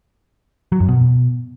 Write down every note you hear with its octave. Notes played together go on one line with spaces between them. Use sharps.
F#3
F#2
B2